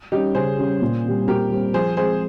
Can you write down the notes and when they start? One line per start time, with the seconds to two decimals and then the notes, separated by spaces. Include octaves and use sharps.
0.12 G3 C#4 D#4 G4
0.35 C#3 G#4 C5
0.59 G3 C#4
0.82 A#2
1.05 G3 C4
1.28 A#2 G4 A#4
1.51 G3 C4
1.74 F3 G#4 C5
1.97 G#3 C4 G#4 C5